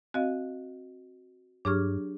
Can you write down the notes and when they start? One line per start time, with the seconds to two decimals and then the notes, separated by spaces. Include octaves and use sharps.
0.14 C4 F#4 D#5 F5
1.65 G2 F#3 D4 G4 G#4 C#6 F6